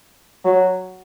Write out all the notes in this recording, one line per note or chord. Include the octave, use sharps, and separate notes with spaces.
F#3